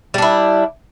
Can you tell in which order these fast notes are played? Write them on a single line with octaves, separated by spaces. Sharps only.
G3 D4 E4